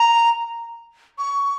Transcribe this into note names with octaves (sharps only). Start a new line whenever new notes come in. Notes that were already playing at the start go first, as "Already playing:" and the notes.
Already playing: A#5
C#6